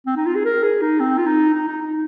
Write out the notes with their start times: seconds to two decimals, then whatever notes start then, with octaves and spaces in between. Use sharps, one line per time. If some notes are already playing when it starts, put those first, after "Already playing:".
0.07 C4
0.16 D#4
0.26 F4
0.35 G#4
0.45 A#4
0.63 G#4
0.82 D#4
1.00 C4
1.18 F4
1.27 D#4
1.54 D#4
1.68 D#4
1.82 D#4